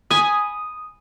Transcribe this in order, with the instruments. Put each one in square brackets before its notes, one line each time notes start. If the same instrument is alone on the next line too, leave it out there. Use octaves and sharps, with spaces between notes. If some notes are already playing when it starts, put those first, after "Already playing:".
[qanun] G#5 B5 [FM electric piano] D#6